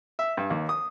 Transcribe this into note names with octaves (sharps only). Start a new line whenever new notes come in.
E5
G2
D#2
D#6